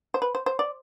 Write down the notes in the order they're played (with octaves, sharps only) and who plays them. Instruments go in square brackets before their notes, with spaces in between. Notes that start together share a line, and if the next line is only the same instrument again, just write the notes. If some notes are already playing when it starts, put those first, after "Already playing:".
[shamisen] C5
B4
C5
C5
D5